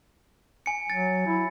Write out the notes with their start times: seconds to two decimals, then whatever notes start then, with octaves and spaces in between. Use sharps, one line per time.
0.66 G#5 C#7
0.90 F#3 A6
1.27 E4